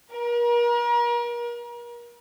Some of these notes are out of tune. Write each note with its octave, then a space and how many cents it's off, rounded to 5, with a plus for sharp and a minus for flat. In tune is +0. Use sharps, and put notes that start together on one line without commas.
A#4 +40